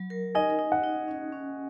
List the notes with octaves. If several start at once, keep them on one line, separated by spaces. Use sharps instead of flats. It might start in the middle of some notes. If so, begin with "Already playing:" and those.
Already playing: F#3
A#4
D#4 D#5 G#5
D#4
F#5
D#4
C#4
C#4